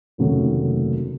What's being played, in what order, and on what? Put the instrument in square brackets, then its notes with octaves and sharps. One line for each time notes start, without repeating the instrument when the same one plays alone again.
[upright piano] F1 D#2 C#3 F#3 A3